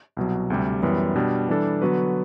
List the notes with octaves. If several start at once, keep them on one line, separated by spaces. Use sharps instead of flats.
C2 B2 F#3
D2 C3 G3
F#2 E3 G3 B3
B2 G3 D4
E3 G3 D4 A4
D3 F#3 B3 F#4 B4